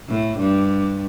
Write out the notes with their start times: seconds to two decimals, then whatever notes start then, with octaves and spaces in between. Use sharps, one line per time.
0.09 A2
0.39 G2